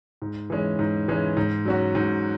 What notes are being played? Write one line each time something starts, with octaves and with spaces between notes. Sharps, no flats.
G#2
E3 G#3 C#4
G#2
E3 G#3 C#4
G#2
F#3 C#4 F#4
G#2